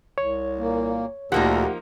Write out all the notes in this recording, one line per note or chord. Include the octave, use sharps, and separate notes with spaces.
C2 C#5
A#2 A#3
D2 A#2 F3 A#3 D#4 G4 A4 F#5